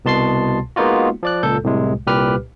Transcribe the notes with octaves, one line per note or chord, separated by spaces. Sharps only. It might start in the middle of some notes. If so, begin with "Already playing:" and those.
C2 B2 A5 C6 A6 C7
G#3 A#3 B3 D#4 F4 F#4
F3 D5 F#6
C#2 A#2 A4 G6
C2 A2 C3 G#3
C2 A#2 G4 B4 F6